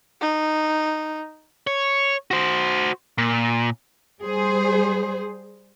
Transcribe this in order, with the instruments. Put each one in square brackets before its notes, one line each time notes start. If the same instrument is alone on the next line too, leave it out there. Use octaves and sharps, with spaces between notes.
[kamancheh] D#4
[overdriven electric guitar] C#5
F#4 C5
A#2
[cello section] G3 G#4 C5